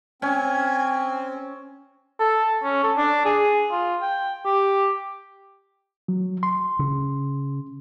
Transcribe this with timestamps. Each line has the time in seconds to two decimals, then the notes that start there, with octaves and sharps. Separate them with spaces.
0.22 C4 C#4 G#5
2.19 A4
2.63 C#4
2.83 A4
2.97 D4
3.25 G#4
3.71 F4
4.02 G5
4.45 G4
6.08 F#3
6.43 C6
6.79 C#3